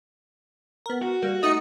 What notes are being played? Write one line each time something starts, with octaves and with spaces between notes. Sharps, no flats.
B3 A#4
F#4
G3 A#3
A3 D#4 D#5 C#7